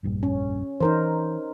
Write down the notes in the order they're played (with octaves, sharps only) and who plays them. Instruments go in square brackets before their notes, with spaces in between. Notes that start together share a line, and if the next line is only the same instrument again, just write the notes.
[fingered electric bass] F1 A#1 G2
[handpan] C#4
[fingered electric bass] E3 [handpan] D#4 A#4 C5